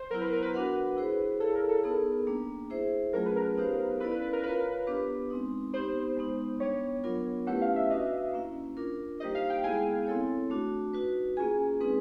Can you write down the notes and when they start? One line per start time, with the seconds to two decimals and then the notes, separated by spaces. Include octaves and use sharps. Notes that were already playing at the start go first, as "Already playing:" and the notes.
Already playing: C5
0.11 F#3 B3 E4 A#4
0.21 B4
0.32 A#4
0.42 B4
0.53 D4 F#4 A#4 D#5 F#5
0.97 E4 G#4 C5
1.40 E4 G#4 A4 C#5 F5
1.54 A#4
1.69 A4
1.84 B3 D#4 G#4
2.27 G3 A#3 D4
2.70 E4 G#4 C5 E5
3.13 F#3 A3 C#4 F4 G#4 A#4
3.26 B4
3.36 A#4
3.57 B3 D#4 G4 C5 F5
4.00 C#4 E4 A4 B4 D5 F5
4.11 B4
4.22 B4
4.33 A#4
4.43 F4 A#4 B4 C#5 F5
4.87 B3 D4 G4 B4
5.30 G#3 C4 D#4
5.74 B3 D#4 G4 C5
6.17 G#3 B3 D#4
6.60 G3 B3 D4 C#5
7.04 F#3 B3 D4 F4 A#4
7.47 A3 C#4 E4 G4 B4 F#5
7.61 F5
7.76 E5
7.90 D4 F#4 B4 D#5
8.33 A#3 C#4 E4
8.77 D4 F4 A#4
9.20 G3 A#3 D#4 G4 C5 D#5
9.35 F5
9.50 G5
9.64 G#3 B3 E4 G#4 G#5
10.07 C4 E4 A4 C#5
10.50 A3 D4 F#4
10.94 D#4 F#4 B4
11.37 A#3 C#4 F4 G#4 G#5
11.80 G#3 C4 D#4 G#4 B4